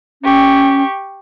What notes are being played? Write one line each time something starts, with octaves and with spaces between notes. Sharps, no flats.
C#4 G4 C#6